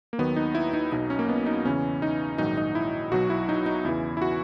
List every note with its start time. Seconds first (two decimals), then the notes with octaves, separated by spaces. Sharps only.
0.13 A#3
0.18 D#2 D#3 F#3 B3
0.36 D#4
0.55 E4
0.73 D#4
0.92 B1 B2 F#3 D#4
1.10 C#4
1.19 A#3
1.29 B3
1.46 D#4
1.65 E2 C#3 E3 C#4
2.02 D#4
2.38 A#1 G#2 D#3 F#3 D#4
2.57 D#4
2.75 E4
3.11 B1 B2 F#3 F#4
3.30 E4
3.49 D#4
3.66 D#4
3.85 E2 C#3 E3 E4
4.17 E4
4.22 F#4